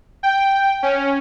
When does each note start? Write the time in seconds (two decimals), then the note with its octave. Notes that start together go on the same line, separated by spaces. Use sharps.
0.23 G5
0.83 C#4